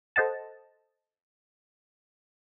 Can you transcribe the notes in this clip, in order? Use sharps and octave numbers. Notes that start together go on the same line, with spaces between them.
A4 C5 D#5 F#5 A5